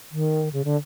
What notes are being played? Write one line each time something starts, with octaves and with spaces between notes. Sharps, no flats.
D#3
C#3
D3